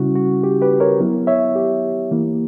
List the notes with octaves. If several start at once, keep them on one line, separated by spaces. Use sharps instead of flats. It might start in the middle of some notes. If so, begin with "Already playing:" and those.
Already playing: C#3 G3 C#4 E4 F#4
F#4
G4
G4 B4
A#4 C#5
F#3 B3 E4
C#5 E5
G4
E3 A#3 E4